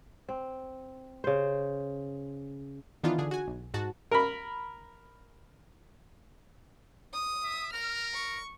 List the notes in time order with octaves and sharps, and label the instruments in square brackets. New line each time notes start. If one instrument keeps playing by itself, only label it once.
[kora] C4
C#3 C5
[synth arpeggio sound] D#3 E3 B3 D4 D#4 F4
D3 G#4
F#4 G#5
B1
G#2 F#4 A5
[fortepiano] A#4 B5
[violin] D#6
[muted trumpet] E5
[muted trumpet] A#4 [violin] F6
[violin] C#6